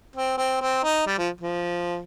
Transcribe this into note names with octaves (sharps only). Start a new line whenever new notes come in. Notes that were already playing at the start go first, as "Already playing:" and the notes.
C4
C4
C4
D#4
G3
F3
F3